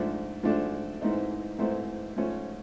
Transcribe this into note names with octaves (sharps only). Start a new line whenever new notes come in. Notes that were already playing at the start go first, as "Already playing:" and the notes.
Already playing: G#2 F3 A3 D4
G#2 F3 A3 D4
G#2 E3 A3 C4 D#4
G#2 E3 A3 C4 D#4
G#2 F3 A3 C#4